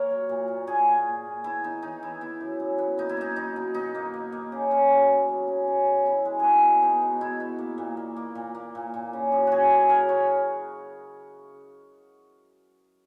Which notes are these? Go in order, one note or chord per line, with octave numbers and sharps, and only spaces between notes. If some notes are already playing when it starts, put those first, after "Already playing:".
Already playing: A#3 A#4 C#5
F#3
A#2
A#2
A#2 G#4
A#2
A#2
A#2
B3 E4
B3 D#4
E3 D#4
E3 E4
B3 E4
F#2
F#2
B3
A#3 D#4
E4
A#3 D#4
B2 D#4
B2
B2 D#4
A#3
A#3
A#3
C#3
C#3
F#3
B3
F#3
C#3
C#3
C#3
B2 E4
G#3
B3 F#4 G#4
B2
B3 D#4
B2
B2 E4
B3
A#3
A#2
A#3
A#3
A#2
A#3
A#2
A#2
C#3
F#2
G#3 F#4 G#4
F#2
C#3 A#4
C#5